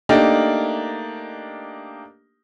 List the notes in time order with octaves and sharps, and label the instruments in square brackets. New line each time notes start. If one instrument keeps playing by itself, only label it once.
[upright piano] A3 A#3 D4 D#4 G4 A#4